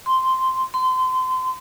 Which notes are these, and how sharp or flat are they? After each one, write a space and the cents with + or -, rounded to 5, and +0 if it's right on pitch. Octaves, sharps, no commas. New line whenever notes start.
C6 -5
C6 -30